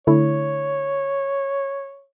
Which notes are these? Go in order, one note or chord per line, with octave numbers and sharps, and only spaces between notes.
D3 A3 E4 C#5